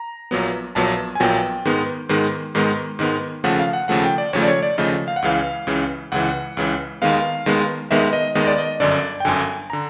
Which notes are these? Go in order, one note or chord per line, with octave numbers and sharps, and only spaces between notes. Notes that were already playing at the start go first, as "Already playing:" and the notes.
Already playing: A#5
A#1 A#2 F#3 B3
A#1 A#2 F#3 B3 A5
G#5
A#1 A#2 F#3 B3 G5
G#2 D#3 G#3 B3
G#2 D#3 G#3 B3
G#2 D#3 G#3 B3
G#2 D#3 G#3 B3
D#2 C#3 F3 A3 F#5
F5
F#5
D#2 C#3 F3 A3 F#5
G5
D5
D#2 C#3 F3 A3 C#5
D5
C#5
D5
D#2 C#3 F3 A3 D#5
F5
F#5
C#2 C#3 E3 F5
C#2 C#3 E3
C#2 C#3 E3 F#5
C#2 C#3 E3
D#2 D#3 G#3 B3 F5
D#2 D#3 G#3 B3
D#2 D#3 G#3 B3 E5
D#5
D#2 D#3 G#3 B3 D#5
D5
D#5
G1 F#2 D3 D5
G5
G1 F#2 D3 G#5
D3 A#5